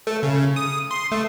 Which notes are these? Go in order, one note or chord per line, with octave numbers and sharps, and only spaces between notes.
A3
C#3
D#6
C6
A3